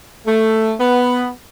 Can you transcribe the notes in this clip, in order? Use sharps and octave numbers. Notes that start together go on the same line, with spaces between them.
A3
B3